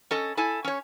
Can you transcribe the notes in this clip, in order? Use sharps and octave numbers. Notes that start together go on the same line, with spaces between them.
C#4 A4 D#5
E4 A4 G#5
C#4 C#5